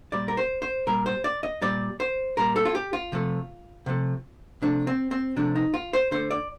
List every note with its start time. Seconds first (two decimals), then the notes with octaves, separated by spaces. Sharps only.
0.12 A#2 G3 D5
0.28 A#4
0.37 C5
0.62 C5
0.87 A#2 G3 A#4
1.06 C5
1.24 D5
1.43 D#5
1.62 A#2 G3 D5
2.00 C5
2.37 A#2 G3 A#4
2.56 A4
2.65 F4
2.75 G4
2.93 F4
3.12 C3 F3 A3
3.86 C3 F3 A3
4.62 C3 F3 A3 D4
4.87 C4
5.11 C4
5.36 C3 F3 A3 D4
5.55 D#4
5.74 F4
5.93 C5
6.11 D3 A3 C5
6.31 D5